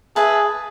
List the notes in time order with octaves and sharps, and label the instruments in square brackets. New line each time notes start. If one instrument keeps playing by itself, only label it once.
[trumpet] G#4 [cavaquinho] B4 E5 A5